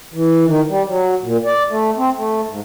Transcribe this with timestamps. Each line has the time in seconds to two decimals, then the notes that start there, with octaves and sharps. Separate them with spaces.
0.14 E3
0.45 D#3
0.69 G3
0.87 F#3
1.23 A#2
1.45 D5
1.70 A3
1.97 C4
2.17 A3
2.48 G#2